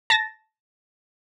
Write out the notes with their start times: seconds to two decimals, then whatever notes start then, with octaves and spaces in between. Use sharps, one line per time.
0.10 A5 A6 A#6